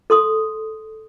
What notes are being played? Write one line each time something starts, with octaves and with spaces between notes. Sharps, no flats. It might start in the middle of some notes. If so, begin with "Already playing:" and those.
A4 C6 D#6